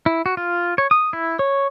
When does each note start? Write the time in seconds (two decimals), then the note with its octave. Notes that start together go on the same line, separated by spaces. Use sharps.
0.06 E4
0.26 F#4
0.37 F4
0.78 C#5
0.91 D#6
1.13 E4
1.39 C#5